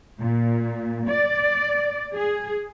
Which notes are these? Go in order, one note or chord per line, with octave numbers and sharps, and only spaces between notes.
A#2
D5
G#4